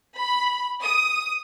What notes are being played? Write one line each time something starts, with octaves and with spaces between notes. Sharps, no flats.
B5
D#6